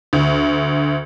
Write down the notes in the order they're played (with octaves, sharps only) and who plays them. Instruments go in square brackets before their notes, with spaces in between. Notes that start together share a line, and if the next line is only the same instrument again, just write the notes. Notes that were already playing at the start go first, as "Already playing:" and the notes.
[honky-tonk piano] D2